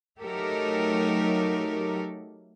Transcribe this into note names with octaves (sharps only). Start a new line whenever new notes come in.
F#3 A3 D#4 G4 A4 A#4